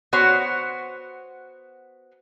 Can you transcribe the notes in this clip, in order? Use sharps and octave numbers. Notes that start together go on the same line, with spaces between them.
B3 F#4 C5 C#5